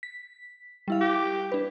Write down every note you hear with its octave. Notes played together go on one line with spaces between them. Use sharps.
B6
G3 E4 F5
G4
D4 B4